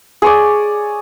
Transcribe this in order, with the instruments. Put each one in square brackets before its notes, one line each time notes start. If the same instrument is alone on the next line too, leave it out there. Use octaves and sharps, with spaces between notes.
[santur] G#4 C#5 D5